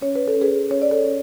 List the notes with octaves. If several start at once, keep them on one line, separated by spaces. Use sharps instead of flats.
C#4 C#5
B4
A4
C#4
G#4 B4
C#4 C#5
D5
A4 C#5
C#4